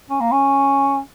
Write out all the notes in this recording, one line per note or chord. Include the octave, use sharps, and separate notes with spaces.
C#4
A#3
C#4